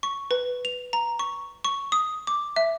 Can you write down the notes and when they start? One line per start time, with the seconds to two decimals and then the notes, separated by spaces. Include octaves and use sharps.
0.03 C#6
0.31 B4
0.65 F7
0.93 A#5
1.19 C#6
1.65 C#6
1.92 D#6
2.27 D6
2.56 E5